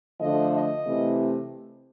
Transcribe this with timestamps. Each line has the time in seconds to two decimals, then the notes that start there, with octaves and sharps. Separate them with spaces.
0.18 D3 F3 A3 D#5
0.52 D#5
0.85 C3 E3 A3